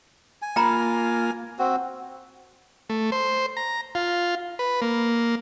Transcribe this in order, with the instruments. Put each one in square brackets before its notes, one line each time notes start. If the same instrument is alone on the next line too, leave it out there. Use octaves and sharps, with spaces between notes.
[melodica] G#5
[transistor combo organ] A#3 F4 [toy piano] G5 A#5 B5
[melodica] C4 F#4
[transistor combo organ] A3
C5
A#5
F4
B4
A#3